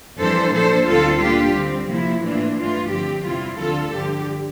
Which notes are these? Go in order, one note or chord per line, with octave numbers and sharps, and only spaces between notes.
F2 E3 G3 D4 A4 C5
A#2 F3 A#3 D4 A4 C5
D2 D3 G3 C4 F4 A4
A#2 G3 D4 F4 G4
D3 G3 C4
C3 F3 A#3 E4
A2 E3 A#3 D4 F4
G2 E3 A3 F4
D3 F3 C4 G4
E2 C3 G3 C4 E4 F4
D2 D3 F3 F4 A4
G2 D3 F3 G4